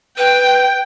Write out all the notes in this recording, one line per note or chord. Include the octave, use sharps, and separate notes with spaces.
B4 G5